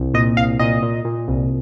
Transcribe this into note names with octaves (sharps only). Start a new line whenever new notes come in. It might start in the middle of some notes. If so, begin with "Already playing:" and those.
Already playing: C2
A#2 D#5
C2 F5
A#2 D#5
A#2
A#2
C2